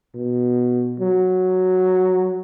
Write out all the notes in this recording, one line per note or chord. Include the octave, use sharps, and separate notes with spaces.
B2
F#3